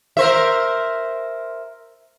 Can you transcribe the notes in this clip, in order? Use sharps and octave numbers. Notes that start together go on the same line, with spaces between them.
A#4 C5 E5